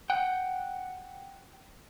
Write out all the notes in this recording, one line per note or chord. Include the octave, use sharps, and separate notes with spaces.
F#5 G5